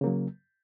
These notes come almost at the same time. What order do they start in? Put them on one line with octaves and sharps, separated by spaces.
C#3 A#3 F#3